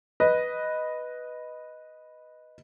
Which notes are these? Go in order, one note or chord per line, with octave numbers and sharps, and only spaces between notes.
B4 D#5